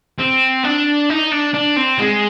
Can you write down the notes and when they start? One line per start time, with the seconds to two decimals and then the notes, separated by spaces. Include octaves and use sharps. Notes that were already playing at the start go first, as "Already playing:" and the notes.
0.20 C4
0.64 D4
1.10 D#4
1.32 D4
1.54 D4
1.77 C4
1.98 G#3